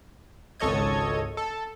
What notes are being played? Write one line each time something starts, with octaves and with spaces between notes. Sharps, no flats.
G#1 C#2 A4 C#5 D#5 G#6
A4